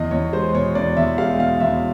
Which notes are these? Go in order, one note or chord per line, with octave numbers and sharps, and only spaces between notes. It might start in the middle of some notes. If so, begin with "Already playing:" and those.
Already playing: E2 D#5
E2 C#5
G#3 C5
B2 C#5
E2 D5
E2 E5
G#3 F5
B2 F5
E2 E5